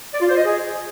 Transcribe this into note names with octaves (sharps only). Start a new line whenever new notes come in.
D5
F4
C5
D#5
G#4